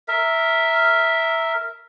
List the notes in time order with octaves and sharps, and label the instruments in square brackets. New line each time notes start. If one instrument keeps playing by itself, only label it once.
[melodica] A#4 E5